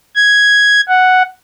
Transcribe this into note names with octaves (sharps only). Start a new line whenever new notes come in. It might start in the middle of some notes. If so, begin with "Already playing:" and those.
G#6
F#5